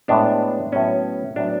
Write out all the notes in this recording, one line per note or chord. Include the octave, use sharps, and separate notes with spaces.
A2 G#3 B3 D4
A2 F#3 B3 C#4
A2 F#3 B3 D4